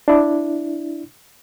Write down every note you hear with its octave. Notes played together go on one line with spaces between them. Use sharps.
D4 E4